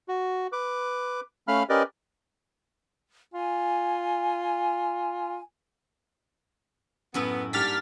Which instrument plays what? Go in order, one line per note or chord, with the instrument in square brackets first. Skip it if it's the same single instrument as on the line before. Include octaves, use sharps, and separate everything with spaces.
[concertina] F#4
B4 D6
A3 C#4 F5 B5 F6
C#4 G4 A#4 B4 D5 D#5
[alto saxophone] F4 [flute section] G#5
[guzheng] F#2 A2 E4 [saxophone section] B3
[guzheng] G#2 G3 A#3 [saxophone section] D4 G4 [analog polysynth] F6 A6 B6